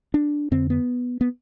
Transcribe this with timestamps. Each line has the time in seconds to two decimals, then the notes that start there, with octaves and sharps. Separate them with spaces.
0.14 D4
0.51 F2 D3 C4
0.70 B3
1.21 B3